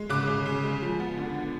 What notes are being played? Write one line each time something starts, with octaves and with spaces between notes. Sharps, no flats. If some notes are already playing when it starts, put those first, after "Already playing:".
Already playing: G#3
C#3 D6 F#6
C#3
C#3
G#3
F3
B3
D3
B3